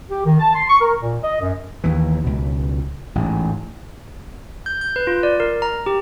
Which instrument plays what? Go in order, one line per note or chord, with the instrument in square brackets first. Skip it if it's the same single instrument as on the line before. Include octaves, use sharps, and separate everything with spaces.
[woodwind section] G4
D#3
A5
C6
C#6
A#4
A#2
D#5
F#2
[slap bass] D#2 E3
C#2 B2
A1 G#2
[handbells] G6
G6
B4
F4
D5
A#4
A#5
G4